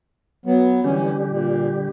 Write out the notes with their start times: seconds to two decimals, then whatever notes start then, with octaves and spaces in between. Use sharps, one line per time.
0.46 F#3 B3
0.84 D3 E3 G3 C#4 G4
1.29 A#2